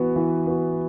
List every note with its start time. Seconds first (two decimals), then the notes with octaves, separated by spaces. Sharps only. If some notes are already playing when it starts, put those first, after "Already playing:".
Already playing: E3 B3 F#4
0.16 E3
0.46 B3 F#4